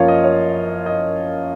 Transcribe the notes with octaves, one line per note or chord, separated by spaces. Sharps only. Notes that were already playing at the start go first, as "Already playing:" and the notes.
Already playing: F#2 F3 A#3 F4 C#5 F5
D#5
C#5
D#5